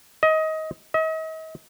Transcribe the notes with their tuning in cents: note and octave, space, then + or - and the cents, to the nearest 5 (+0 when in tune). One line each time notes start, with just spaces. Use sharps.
D#5 +20
D#5 +40